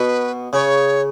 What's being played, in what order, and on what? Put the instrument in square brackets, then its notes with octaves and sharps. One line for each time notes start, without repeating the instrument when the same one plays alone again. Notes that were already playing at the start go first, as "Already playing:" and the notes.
Already playing: [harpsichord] B2 [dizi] B4
[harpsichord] C#3 [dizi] C#5